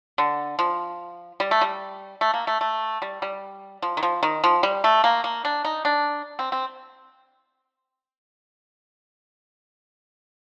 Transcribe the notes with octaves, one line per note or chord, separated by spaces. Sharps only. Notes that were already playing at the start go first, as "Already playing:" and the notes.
D3
F3
G3
A3
G3
A3
A#3
A3
A3
G3
G3
F3
D#3
F3
D#3
F3
G3
A3
A#3
A#3
D4
D#4
D4
C4
C4